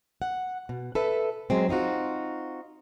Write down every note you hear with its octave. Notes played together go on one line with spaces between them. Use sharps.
F#5
B2
A4 B4 E5
F#3 G#3 C4
C4 D#4 F4 F#4